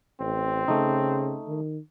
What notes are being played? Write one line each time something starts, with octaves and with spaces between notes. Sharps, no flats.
A1 C4
C#3 A3 D#4
D#3